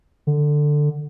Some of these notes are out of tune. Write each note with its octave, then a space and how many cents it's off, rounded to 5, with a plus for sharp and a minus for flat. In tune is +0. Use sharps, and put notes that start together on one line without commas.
D3 +10